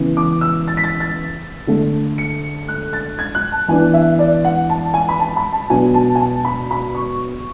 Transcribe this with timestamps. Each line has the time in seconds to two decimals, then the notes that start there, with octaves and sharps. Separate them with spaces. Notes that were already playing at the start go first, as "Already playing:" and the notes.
Already playing: C#3 E3 B3
0.17 D6
0.41 E6
0.68 A6
0.77 B6
0.84 A6
1.00 A6
1.67 D3 A3 D4
2.18 C#7
2.68 F#6
2.93 A6
3.19 G#6
3.35 F#6
3.52 A5
3.68 E3 B3 D4 G#5
3.94 E5
4.19 D5
4.45 F#5
4.70 A5
4.94 G#5
5.09 B5
5.20 A5
5.37 B5
5.52 A5
5.70 B2 F#3 B3 D4 G#5
5.94 A5
6.15 G#5
6.21 A5
6.45 B5
6.71 B5
6.95 C#6